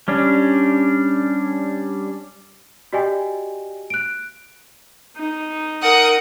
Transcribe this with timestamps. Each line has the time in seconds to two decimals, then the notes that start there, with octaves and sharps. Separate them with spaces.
0.08 G3 C#4 D4
2.93 F#4 G4 D5 D#5 G5 G#5
3.90 F#6 D7
5.18 D#4
5.81 A#4 F#5 D#6